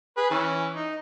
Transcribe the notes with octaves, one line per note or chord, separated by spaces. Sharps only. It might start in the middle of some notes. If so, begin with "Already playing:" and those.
G#4 B4
E3 C#4
D#4